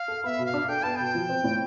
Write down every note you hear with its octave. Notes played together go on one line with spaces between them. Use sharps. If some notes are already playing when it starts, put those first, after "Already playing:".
Already playing: F5
A4
B3 E5 F5
B2
F5
D4
A4 G5
B3 A5
B2 G5
F3
C4
A2